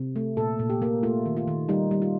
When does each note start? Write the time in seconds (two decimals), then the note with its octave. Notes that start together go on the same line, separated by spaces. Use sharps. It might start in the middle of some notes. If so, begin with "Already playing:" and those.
Already playing: C3
0.16 A3
0.37 A#2 A4
0.59 A#2
0.70 G4
0.82 A#3
1.03 A3 F4
1.26 D#3
1.37 F4
1.48 D#3
1.69 G3 D#4
1.91 G3
2.02 F4